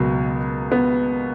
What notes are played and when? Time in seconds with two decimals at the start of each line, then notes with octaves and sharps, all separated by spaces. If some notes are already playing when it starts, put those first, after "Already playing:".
Already playing: C#2 B2 F#3 A#3
0.72 B3